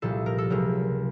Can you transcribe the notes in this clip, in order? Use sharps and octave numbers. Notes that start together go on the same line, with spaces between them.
C2 A#2 F3 A4
A#4
A4
C#2 C3 F#3 A#4